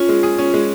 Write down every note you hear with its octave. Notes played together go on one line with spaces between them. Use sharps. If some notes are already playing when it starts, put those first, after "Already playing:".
Already playing: C#4 F4
G#3
G#4
C#4
G#3